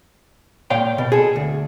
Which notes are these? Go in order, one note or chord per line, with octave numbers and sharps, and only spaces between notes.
A#2 C#5 F5 G5
B2
G#4 A4
D2